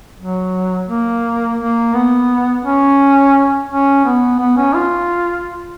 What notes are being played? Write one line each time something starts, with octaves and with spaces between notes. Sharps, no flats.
F#3
A#3
A#3
B3
C#4
C#4
B3
B3
C#4
F4